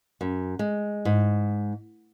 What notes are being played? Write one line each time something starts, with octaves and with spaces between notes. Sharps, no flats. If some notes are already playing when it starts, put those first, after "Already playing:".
F#2
G#3
G#2